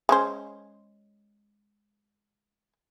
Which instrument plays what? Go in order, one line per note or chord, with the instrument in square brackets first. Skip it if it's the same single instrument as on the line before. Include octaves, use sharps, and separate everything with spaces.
[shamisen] G#3 C#4 C5